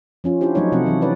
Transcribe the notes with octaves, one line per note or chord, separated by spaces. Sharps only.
F3 C#4 F4
D4 E4 F4 G4 C5
F3 F#3 A3 D#4 C#5
C3 F3 A3 C4 F#5
E3 F#3 C4
C#4 E4 B4 D5